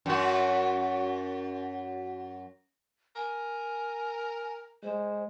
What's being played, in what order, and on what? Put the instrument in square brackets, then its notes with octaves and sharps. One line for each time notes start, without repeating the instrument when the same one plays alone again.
[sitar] F#2 F#4
[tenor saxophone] A#4 [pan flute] G#5
[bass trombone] G#3 [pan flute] C5